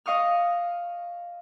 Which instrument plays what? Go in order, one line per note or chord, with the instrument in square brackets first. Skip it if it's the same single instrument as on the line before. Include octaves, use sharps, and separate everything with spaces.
[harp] D#5 F5 C#6 D#6 F6